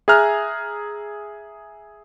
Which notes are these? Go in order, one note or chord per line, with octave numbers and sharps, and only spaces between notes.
G#4 E5 G#5 A#5 F6 F#6